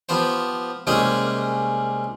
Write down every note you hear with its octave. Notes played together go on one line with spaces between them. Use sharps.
F3 B3 G4 C5
C2 G#3 A#3 C#4 G4 G#4